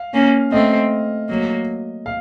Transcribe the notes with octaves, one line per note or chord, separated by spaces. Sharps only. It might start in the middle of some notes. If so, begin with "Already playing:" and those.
Already playing: F5
A#3 C#4
A3 C4 D#5
F#3 A#3
F5